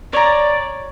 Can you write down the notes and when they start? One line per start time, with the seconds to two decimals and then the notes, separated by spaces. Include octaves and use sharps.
0.13 C#5 D5 A#5